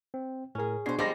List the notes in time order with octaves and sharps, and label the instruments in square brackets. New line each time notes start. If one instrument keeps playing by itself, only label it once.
[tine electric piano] C4
[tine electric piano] A2 A#4 [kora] C#4 G#4
[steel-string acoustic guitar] B2 C5 [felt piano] D4 [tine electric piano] C#6 G#6 C7
[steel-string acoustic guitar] F3 G3 G#3 [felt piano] D6 A#6